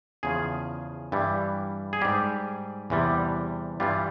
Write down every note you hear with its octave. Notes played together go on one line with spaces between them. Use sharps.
E2 C#3 F3 G#4
G2 E3 G3
G#4
G#2 G3 G4
E2 C3 E3 G3
G2 E3 G3 F4